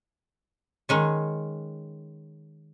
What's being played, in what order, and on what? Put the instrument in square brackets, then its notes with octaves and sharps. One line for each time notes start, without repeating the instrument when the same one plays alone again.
[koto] D#3 G#3 C#4